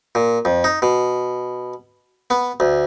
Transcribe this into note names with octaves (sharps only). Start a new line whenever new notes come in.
A#2
F2
D#4
B2
B3
D2